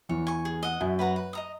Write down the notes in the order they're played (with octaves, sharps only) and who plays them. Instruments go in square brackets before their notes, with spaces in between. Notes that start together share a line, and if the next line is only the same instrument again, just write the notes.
[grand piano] E2 E3 [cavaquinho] C#5
[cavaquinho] G#5 C#6
G#4
D#5 F#5
[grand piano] F#2 F#3 [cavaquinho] E4
[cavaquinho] B4 F#5 A#5
B4
D#5 A#5 D#6